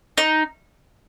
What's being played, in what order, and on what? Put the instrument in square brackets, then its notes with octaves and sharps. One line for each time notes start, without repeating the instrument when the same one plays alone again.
[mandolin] D#4